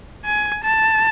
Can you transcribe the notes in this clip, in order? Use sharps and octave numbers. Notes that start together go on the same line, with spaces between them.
G#5
A5